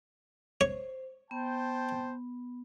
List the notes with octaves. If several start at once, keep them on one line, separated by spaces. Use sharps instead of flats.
C5 C#5
B3 C5 G5 A5